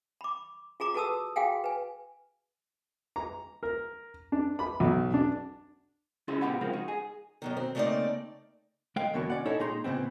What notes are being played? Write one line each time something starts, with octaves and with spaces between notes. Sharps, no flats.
B5 D6
F4 G#4 A#5 D6
F#4 A4 B4 A5 D#6 E6
F#4 G#4 F5 G5 G#5
B4 G#5
A#5
A#4
D4
B5
B1
D4
C#2 C#4 E4 G#4 D#5 C6
A#2 B3 G4 F#5 B5
C#3 F3 G#3 A#3 C4
D#4 F#4
G#4
F#2 B2 D#3
C4
C#3 A3 A#3 C4 D#4 D5
G#3 F5 G5
E2 B2 D3 F#3 A#3
C#4 D5 F#5
C#4 D#4 E4 A4 C#5
A#2 G#3 D#4 G#4 A#5 C6
A#2 C#3 F#3 B3 C4